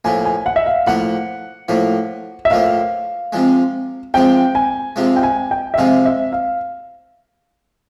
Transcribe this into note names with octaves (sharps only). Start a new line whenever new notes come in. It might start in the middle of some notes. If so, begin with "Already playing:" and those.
A2 F3 A#3 G#5
G#5
F#5
E5
F5
A2 F3 A#3 F#5
A2 F3 A#3
E5
A2 F3 A#3 F5
C3 F3 G#3
C3 F3 G#3 G5
G#5
C3 F3 G#3
G5
G#5
G5
E5
C3 F3 G#3 F5
E5
F5